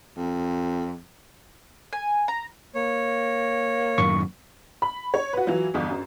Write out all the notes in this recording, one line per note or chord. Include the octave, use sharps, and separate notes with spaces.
F2
G#5
A#5
A#3 C#5
F#2 A2 D#3 C#6
B5
C#5
F#4 B4
E3 F#3 F4
G1 E2
F#2